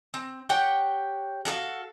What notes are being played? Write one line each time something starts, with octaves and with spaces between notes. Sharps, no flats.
C4
G4 C#5 F#5 G5
F#4 A4 D5 F5